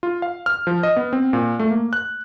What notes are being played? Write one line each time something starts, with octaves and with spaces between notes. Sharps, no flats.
F4
F5
F6
F3
D#5
B3
C4
A#2
A3
A#3
F#6